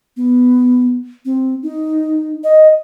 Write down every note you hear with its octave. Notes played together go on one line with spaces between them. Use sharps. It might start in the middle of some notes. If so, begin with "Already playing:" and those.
B3
C4
D#4
D#5